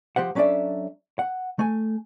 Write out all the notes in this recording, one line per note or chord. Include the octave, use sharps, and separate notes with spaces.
F3 G4 C5 F#5
F#3 C#4 D4 A4 D5 E5
F#5
A3 G#5